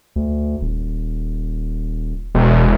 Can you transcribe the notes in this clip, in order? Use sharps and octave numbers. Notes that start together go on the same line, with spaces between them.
D2
D#1
E1 B2